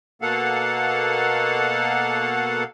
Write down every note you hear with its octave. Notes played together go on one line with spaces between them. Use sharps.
B2 A#3 A4 F5 F#5